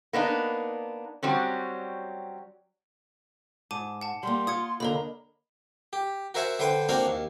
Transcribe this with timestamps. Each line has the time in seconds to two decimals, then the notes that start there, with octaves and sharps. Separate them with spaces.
0.13 A#3 B3 D4 D#4
1.23 F#3 G3 C4 C#4
3.71 G#2 A5 D6 D#7
4.01 F#5 A5
4.23 G3 A#3 C6
4.47 F4 D#6 G#6 C#7
4.80 D#2 D3 A#4 D#5 A#5 B5
5.93 G4
6.34 F#4 A#4 C5 E5 F#5 G#5
6.59 D3 B4 C5 G5 C6
6.89 A#3 C4 D4 F#4 C5 F5
7.07 D#2